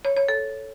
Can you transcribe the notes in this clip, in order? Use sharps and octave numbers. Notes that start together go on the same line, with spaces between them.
C#5
C#5
A4